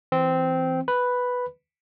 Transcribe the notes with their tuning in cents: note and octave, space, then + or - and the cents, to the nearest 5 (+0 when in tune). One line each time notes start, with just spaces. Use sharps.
E3 +0 C4 -10
B4 +0 B5 +0